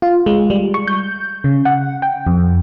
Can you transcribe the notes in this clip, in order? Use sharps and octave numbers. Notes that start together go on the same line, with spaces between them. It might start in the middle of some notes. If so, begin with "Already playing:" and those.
F4
G#3
G3
C#6
G6
C#3
F#5
G5
F2